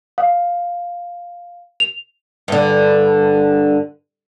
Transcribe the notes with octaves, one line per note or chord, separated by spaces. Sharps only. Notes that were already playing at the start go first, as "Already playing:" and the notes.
F5
F7
G2 D3